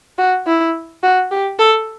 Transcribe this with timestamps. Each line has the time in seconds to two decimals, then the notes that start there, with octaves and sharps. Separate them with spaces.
0.18 F#4
0.47 E4
1.03 F#4
1.31 G4
1.59 A4